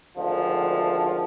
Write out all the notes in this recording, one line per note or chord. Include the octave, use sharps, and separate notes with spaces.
G#1 D2 F3